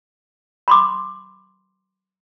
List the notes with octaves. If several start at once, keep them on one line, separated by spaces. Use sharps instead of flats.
B5 C6 D6